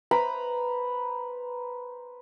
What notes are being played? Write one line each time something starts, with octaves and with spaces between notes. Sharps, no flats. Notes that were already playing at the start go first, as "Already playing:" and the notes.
B4 C5 A#5 B5